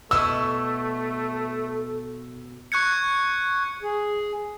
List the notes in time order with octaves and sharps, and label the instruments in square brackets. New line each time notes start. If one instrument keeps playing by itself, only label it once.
[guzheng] B2 E4 [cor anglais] A3 [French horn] A4 [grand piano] E6
[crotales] C#6 F#6 G#6 C#7
[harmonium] G#4